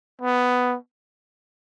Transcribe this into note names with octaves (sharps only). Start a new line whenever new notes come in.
B3